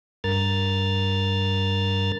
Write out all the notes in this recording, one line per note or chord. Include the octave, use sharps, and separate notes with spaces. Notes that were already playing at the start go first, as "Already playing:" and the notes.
G2 A#4 F6 A6